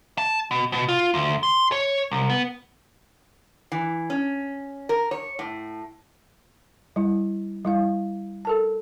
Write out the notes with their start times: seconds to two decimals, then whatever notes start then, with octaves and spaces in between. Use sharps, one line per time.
0.18 A5
0.51 B2
0.72 B2
0.88 F4
1.14 D2
1.43 C6
1.72 C#5
2.12 C2
2.30 B3
3.72 E3
4.10 C#4
4.89 A#4
5.11 C#5
5.39 A2
6.96 G3 E4
7.65 G3 E4 F5
8.45 A4 A#4 A5